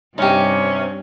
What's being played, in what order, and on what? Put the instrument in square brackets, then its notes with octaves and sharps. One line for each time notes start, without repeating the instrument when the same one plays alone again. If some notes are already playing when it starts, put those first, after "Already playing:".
[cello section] G2 [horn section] C3 C#4 [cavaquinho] D#4 G4